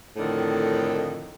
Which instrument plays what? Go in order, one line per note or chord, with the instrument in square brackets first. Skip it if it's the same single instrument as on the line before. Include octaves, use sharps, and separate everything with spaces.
[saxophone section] F2 A2 D3 D#3